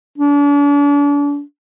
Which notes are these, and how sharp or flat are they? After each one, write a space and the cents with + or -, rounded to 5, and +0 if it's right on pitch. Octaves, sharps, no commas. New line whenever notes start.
D4 -40